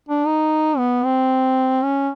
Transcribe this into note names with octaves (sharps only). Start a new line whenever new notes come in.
D4
D#4
B3
C4
C#4